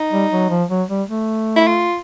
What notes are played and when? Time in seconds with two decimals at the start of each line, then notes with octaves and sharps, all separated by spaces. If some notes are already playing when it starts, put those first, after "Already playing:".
Already playing: D#4
0.12 G3
0.32 F#3
0.50 F3
0.70 F#3
0.89 G3
1.08 A3
1.56 E4
1.67 F4